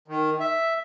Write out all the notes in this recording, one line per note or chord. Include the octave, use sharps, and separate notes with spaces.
D#3
E5